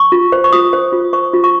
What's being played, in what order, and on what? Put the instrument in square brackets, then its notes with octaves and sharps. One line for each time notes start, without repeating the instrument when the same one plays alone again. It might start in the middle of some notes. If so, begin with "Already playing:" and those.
Already playing: [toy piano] C#6
F4
C5
C#6
F4 D#6
C5
F4
C5 C#6
F4
C#6